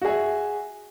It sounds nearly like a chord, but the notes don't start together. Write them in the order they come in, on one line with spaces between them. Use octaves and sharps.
F#4 G#4 E5